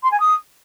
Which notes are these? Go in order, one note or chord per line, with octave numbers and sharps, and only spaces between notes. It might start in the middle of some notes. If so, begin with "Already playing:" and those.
C6
G#5
D#6